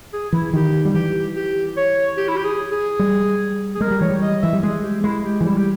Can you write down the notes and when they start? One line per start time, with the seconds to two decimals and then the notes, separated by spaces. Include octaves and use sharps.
0.13 G#4
0.33 E3 E4
0.53 D#3 G4
0.85 G3
0.94 E3 G4
1.36 G4
1.77 C#5
2.17 G4
2.28 E4
2.37 G4
2.45 G#4
2.72 G#4
2.99 G3
3.75 G#4
3.81 G#3 A#4
3.91 G3
4.01 E3 C#5
4.10 G3
4.22 D#5
4.42 E3 E5
4.53 G3
4.63 G#3 G#4
4.84 G4
5.04 G#3 E4
5.25 G4
5.41 E3
5.45 G3 E4
5.57 G4